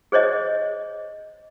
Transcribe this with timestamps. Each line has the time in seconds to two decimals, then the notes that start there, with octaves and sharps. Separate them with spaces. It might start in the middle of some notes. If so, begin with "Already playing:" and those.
0.12 G#4 C5 C#5 D#5